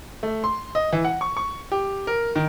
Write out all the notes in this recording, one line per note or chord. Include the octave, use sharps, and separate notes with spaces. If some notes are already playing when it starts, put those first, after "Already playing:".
A3
C6
D#5
E3
F#5
C#6
C#6
G4
A#4
D#3